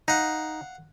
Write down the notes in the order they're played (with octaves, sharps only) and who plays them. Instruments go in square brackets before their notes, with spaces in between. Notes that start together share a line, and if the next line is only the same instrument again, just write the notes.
[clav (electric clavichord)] D#4 [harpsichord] F5 F#5